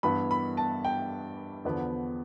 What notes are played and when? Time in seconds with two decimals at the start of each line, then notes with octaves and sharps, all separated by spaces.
0.03 G2 E3 B3 E4 B5
0.31 B5
0.57 A5
0.85 G5
1.65 E2 D3 F3 B3